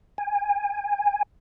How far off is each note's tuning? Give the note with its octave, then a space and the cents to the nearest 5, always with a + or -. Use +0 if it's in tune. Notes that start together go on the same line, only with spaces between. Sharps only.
G#5 -25